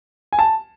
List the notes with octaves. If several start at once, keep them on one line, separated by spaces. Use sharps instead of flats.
G#5
A5